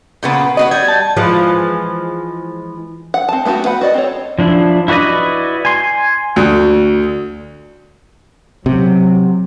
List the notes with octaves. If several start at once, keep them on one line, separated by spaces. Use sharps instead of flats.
A#2 C#3 B3
B3 D4 F#4 D#5
G3 G#6
A5
E3 F3 G#3
F#5
C4 A5
A3 B3 E4 F#4 G4
B4 F#5 B5
F#4 D5 D#5
C4 A4 C#5
F3 D4 E4
E4 F#4 B4 D5 D#5
G#5 C6
D2
C3 F#3